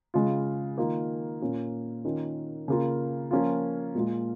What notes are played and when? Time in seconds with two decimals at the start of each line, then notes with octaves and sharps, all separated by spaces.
0.14 C#3 G#3 F4
0.78 D#3 A#3 F4
1.41 A#2 A#3 C#4 F4
2.05 D#3 A#3 C#4 F4
2.68 C#3 A#3 F4
3.31 F3 A#3 C#4 F4
3.95 A#2 G#3 F4